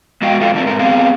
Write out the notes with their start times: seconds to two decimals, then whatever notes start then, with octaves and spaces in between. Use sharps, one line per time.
0.22 G#3 B3 F#4 D#5 F5 G5
0.41 F#2 F4 A4 F5
0.54 D3 A3 C4
0.67 G#2 A#4
0.79 B3 C4 G#4 F5